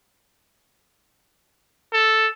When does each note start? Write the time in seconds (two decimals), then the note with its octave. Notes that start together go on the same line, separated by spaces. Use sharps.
1.93 A4